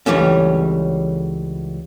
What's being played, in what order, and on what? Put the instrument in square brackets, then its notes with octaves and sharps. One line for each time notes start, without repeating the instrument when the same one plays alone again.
[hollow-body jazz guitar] C#2 G#2 E3 G3 A3 C#4